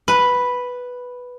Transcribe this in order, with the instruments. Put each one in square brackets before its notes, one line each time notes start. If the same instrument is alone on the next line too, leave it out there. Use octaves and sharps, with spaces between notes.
[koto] B4